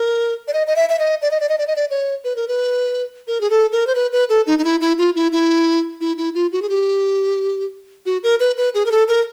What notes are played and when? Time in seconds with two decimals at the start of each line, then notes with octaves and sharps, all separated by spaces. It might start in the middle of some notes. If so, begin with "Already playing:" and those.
Already playing: A#4
0.48 D5
0.53 D#5
0.67 D#5
0.76 E5
0.89 E5
0.99 D#5
1.22 D5
1.31 D#5
1.40 D5
1.49 D#5
1.58 D5
1.67 D#5
1.76 D5
1.91 C#5
2.24 B4
2.36 A#4
2.48 B4
3.27 A#4
3.41 G#4
3.50 A4
3.72 A#4
3.87 C5
3.95 B4
4.12 B4
4.29 A4
4.47 D#4
4.59 D#4
4.64 E4
4.81 E4
4.98 F4
5.16 E4
5.32 E4
6.01 E4
6.18 E4
6.35 F4
6.52 F#4
6.62 G#4
6.69 G4
8.06 F#4
8.23 A#4
8.40 B4
8.57 B4
8.75 G#4
8.86 A#4
8.91 A4
9.08 A#4